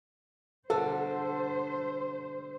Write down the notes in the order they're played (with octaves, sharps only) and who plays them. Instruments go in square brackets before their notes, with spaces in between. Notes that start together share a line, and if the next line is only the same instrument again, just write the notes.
[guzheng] B2 D3 G3 [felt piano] A4 [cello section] C5